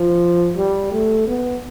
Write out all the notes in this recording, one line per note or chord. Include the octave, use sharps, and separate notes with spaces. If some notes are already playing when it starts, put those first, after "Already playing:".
Already playing: F3
G3
A3
B3